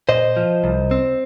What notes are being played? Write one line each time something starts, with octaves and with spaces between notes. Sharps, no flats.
A#2 C5 D#5
F3
C2
C4